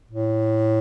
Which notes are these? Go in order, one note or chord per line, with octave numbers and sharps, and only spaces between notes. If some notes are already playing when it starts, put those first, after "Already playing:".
A2